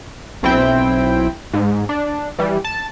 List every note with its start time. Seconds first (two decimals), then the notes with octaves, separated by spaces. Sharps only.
0.43 B1 C4 E4 G5
1.54 G#2
1.89 D4
2.39 E3 G3
2.64 A5